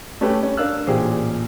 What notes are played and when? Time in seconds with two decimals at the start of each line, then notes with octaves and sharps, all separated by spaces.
0.21 A3 C#4 G4 A4 B4 G5
0.43 C#4
0.57 D4 A#4 F5 E6 F#6
0.87 A1 A#2 G4 G#4 C5 G5